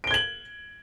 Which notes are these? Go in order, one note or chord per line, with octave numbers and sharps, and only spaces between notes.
G#6 D7 F#7 G7